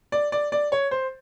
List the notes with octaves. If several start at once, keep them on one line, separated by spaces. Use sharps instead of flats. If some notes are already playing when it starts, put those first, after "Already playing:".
D5
D5
D5
C#5
C5